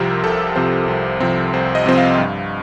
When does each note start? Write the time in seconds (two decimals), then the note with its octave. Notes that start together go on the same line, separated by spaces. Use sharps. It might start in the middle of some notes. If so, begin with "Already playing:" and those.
Already playing: C2 C3 F3 C4 G4 A#4 C5
0.23 C2 A4
0.56 C3 F3 C4 C5
0.88 C2
1.20 C3 F3 C4
1.53 C2 C5
1.75 D#5
1.86 C3 F3 C4
1.98 F5
2.18 G2